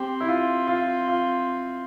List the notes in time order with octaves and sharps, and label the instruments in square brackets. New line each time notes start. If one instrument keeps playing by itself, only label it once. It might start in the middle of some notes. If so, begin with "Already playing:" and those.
Already playing: [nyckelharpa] C4 [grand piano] G4
[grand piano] E4
F4
F4
F4